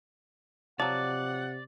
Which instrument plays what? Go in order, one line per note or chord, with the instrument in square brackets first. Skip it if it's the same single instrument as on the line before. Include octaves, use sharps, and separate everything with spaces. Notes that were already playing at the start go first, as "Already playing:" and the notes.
[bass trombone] C3 [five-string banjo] F3 F#3 [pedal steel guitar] D5 [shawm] F#5